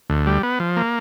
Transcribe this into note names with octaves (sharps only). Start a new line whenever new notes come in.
D2
G3
B3
F3
A#3